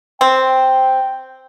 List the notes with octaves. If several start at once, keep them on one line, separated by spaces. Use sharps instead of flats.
C4 G5